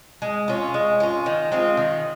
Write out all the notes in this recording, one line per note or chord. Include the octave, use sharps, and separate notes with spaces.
G#3
C#4 F4
G#3
C#4 F4
D#3
G#3 C4 F4
D#3